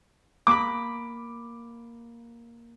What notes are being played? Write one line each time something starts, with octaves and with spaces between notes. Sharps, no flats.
A#3 B5 D6